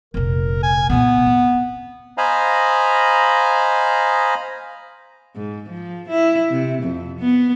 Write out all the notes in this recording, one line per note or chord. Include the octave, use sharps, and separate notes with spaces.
F1 A#1 A#4
G#5
A#2 C#3 B3
C4
C5 D#5 F5 G#5 A#5 B5
G#2
F3
E4
C3
F2
B3